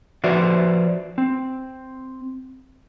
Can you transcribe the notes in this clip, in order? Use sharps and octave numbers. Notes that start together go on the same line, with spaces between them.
F3 F#4 B4 C5 D5 E5
C4